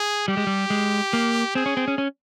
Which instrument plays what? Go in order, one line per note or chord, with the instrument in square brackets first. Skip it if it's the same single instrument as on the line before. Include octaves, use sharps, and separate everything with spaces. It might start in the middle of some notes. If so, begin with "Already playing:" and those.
Already playing: [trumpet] G#4
[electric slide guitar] G3 [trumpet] G4
[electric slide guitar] G#3
G3
G#3
A#3
[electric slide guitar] C4 [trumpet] G#4
[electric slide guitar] C#4
C4
C#4
C#4